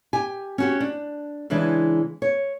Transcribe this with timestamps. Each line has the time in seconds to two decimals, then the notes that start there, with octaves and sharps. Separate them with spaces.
0.13 G4 G#5
0.58 C#4 F#4 G4
0.80 D4
1.50 C#3 E3 G#3 D4
2.22 C#5